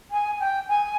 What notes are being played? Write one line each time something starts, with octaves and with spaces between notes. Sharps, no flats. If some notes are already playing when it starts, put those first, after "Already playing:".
G#5
G5
G#5